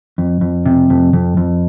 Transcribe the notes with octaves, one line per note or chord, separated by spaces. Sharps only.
F2
F2
C3
F2
F2
F2